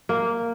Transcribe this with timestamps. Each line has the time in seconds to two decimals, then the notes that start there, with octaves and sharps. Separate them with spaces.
0.09 A#3